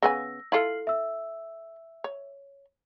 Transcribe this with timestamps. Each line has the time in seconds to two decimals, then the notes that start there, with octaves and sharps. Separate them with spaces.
0.02 C#3 B3 G#5 E6 A#6
0.52 E4 F4 A4 F6 C7 F#7
0.87 E5 E6
2.04 C#5